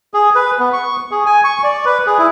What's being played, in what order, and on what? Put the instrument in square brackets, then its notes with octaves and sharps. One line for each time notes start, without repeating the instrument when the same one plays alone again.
[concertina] G#4
B4
B3
C#6
G#4
G#5
C#6
D5
B4
G#4
E4